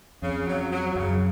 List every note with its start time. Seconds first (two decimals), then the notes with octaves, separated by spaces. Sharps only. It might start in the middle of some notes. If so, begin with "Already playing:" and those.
0.22 F2 C#3
0.47 F#3
0.71 F#3
0.95 F#2 C#3